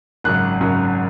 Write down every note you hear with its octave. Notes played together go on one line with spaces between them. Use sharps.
G#1 F#2 C#3 F#3 F#6
G#1 F#2 C#3 F#3